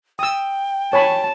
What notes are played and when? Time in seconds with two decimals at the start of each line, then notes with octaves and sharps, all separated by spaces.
0.19 G5 D#6 E6
0.93 C#5 G#5 A5 B5